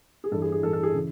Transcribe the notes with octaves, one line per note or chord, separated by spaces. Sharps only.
G#4
G2 E3 A4
G#4
G#4
G2 E3 A4
A4
G#4
C#3 E3